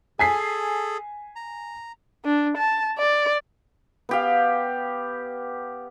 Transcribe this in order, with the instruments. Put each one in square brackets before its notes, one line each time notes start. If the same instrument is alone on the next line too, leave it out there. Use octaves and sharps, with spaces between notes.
[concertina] G#4 A4 [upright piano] G#5 B6 C7
[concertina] A#5
[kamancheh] D4
A5
D5
[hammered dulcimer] B3 G4 F5